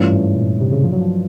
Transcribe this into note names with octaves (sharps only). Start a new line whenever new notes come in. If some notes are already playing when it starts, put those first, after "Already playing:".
Already playing: G2 E3 A3 C#4 F4
G#2
A#2
C3
C#3
F3
F#3
F3